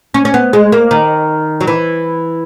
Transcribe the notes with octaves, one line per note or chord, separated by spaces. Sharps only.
C#4
C#4
B3
G#3
A#3
D#3
F#3
E3